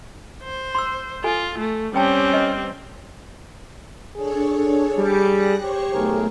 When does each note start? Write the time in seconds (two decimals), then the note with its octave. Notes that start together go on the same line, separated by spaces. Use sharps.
0.43 C5
0.75 C6 D6 E6
1.24 F4 A4 G#5
1.59 A3
1.94 G3 C4 C#4 B4 G5 A5
2.32 B4 D#5 A5
4.17 D4 G#4 A4 C#5
4.97 G3 D6 C#7
5.31 F#6 A#6
5.60 G4 C5 C#5 C#6
5.93 B1 A3 G#4 A#4